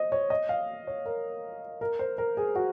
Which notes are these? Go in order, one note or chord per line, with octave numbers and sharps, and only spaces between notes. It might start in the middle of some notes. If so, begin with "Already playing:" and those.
Already playing: C5 D#5
C#5
D#5
F5
C#5
A#4
A#4
C5
A#4
G#4
F#4